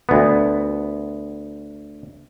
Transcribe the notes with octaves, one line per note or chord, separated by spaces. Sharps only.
D2 B3